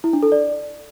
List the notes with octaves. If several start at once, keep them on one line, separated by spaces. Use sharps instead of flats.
E4
D4
A4
D5